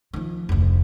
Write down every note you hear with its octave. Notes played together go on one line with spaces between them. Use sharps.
D#3 F3
F1 D2